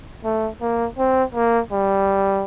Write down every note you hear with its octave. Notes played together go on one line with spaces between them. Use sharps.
A3
A#3
C4
A#3
G3